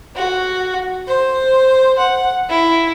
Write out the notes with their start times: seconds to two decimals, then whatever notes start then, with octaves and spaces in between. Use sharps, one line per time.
0.16 F#4
1.07 C5
1.98 F#5
2.49 E4